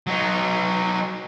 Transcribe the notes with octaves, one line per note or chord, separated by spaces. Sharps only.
F#3 D#4